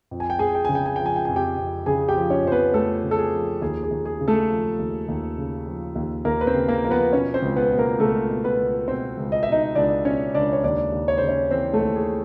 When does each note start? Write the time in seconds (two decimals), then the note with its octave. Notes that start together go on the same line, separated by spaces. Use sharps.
0.11 F2
0.20 G#5
0.30 G5
0.39 F2 G#4 G#5
0.55 G5
0.65 C#3 G#5
0.75 G5
0.86 G#5
0.96 F3 G5
1.06 G#5
1.16 G5
1.25 F2 G#5
1.36 G4 G5
1.57 F2
1.86 C#3 G#4 G#5
2.08 G4 G5
2.16 F3
2.30 C#4 C#5
2.44 F2 C5
2.52 B3 B4
2.74 F2 A3 A4
3.04 C#3
3.11 A4
3.19 G#4
3.33 F3
3.62 D#2 G#4
3.83 G#4
3.91 D#2
4.05 G#4
4.21 C#3
4.28 A3 A4
4.50 F3
4.79 D#2
5.08 D#2
5.38 C#3
5.67 F3
5.95 D#2
6.25 D#2 A#3 A#4
6.41 B4
6.47 C4 C5
6.54 C#3
6.68 A#3 A#4
6.83 F3 A#4
6.91 B3 B4
7.13 B2 C#4 C#5
7.34 C4 C5
7.42 C#2
7.56 B3 B4
7.72 B2
7.79 A#3 A#4
8.00 C#2 A3 A4
8.30 B2
8.44 B3 B4
8.58 C#2
8.88 B2 C4 C5
9.17 C#2
9.32 D#5
9.43 B2 E5
9.52 D#4 D#5
9.75 C#2 D4 D5
10.05 B2 C#4 C#5
10.35 C#2 D4 D5
10.53 C#5
10.64 D#2 D4 D5
10.92 D#2
11.08 C#5
11.18 C#3 C5
11.29 C#4 C#5
11.51 E3 C4 C5
11.73 A3 A4
11.81 D#2
11.96 G#4